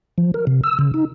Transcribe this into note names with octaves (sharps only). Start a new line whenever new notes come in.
F3
A#4
C3
E6
C#3
D#4